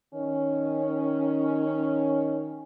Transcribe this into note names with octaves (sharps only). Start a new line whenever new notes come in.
D#3 C#4